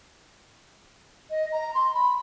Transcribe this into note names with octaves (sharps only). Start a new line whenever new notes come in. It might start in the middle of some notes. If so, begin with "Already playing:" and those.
D#5
A#5
C6
B5